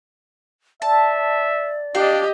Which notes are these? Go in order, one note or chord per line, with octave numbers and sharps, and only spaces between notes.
D5 E5 A5
D4 G4 D#5 F5